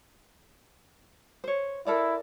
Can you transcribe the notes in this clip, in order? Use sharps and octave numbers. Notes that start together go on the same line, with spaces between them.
C5 C#5
E4 A4 A#4 D5